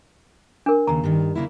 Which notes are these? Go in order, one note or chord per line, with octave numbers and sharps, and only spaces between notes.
D4 A#4
D#2 C#3 A#5
G2 D#3
C#3 A#3 E4